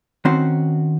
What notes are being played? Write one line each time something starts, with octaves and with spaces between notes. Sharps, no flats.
D#3 C4 C#4 F#4 C5